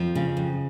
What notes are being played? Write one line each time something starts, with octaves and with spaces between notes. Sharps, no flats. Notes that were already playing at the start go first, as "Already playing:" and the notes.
Already playing: F2 F3
C#3
F2